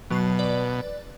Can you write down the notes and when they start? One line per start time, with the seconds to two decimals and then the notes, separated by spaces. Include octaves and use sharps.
0.10 B2 F#3 A5 C7
0.39 B4 D5